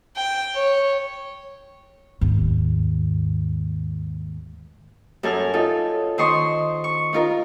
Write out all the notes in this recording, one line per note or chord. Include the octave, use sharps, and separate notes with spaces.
G5
C#5
D#2 G#2
F#2 A4 G#5 F6
D#4 F4 A4
D#3 C5 D#5 C6 C#6
C#6
D#4 F4 A#4